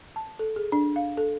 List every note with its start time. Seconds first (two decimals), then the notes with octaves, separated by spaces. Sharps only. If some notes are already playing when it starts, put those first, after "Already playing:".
0.16 A5
0.39 A4
0.56 G#4
0.72 D4
0.96 F5
1.17 A4